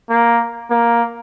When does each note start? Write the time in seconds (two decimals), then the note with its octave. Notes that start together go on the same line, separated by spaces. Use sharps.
0.10 A#3
0.71 A#3